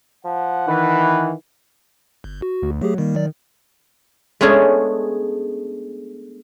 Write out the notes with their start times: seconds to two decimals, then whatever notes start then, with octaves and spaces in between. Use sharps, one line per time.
0.25 F3 F#5
0.68 D#3 E3 B4
2.24 G1
2.42 F#4
2.62 D2
2.82 F#3 A3 G4 G#4
2.98 D#3 G3 A#3
3.15 F#3 D5
4.41 G#3 A3 B3 C#4 D4 G#4